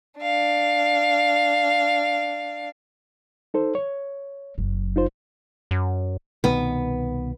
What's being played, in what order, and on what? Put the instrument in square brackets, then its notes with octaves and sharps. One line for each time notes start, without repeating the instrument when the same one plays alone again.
[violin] D4 F5
[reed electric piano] D#4 A4 C5
C#5
[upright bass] F#1 F#3
[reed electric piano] D#4 F4 C5
[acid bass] F#2
[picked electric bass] C2 B2 D#3 [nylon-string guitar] B3